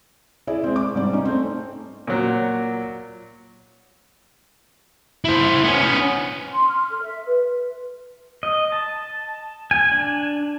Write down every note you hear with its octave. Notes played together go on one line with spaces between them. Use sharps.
E4 G#4 D5
G#3 C4
D6
G#2 G3 D5
C#4 D#4
A3 C4
A#2 F#3
E4 C5
B3 C#4
C6
F6
A4
E5
B4
D#5
A5
G#5
D4